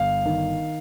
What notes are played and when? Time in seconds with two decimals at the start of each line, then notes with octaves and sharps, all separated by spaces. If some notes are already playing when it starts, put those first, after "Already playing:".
Already playing: G1 F5
0.25 D#3